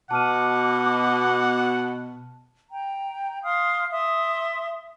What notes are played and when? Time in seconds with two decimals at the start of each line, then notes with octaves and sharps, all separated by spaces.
0.11 B2 F#5 A5 D6 F6 D#7
2.70 G5 A#5
3.44 F5 C6 D#6 F6
3.91 E5 C6 D#6